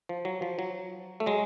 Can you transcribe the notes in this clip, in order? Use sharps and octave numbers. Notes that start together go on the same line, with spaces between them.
F3
F#3
F3
F#3
A3
F#3 G#3